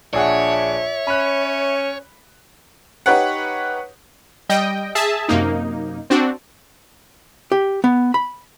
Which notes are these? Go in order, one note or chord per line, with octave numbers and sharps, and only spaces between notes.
A#1 D4 G#4 C#5 E5 F#5
C#4 B5 F#6
D#4 G4 B4 C#5 F#5
G3 D#5 G5
G#4 E5 A5
F#2 C3 A#3 D#4
C4 D4 F#4
G4
B3
B5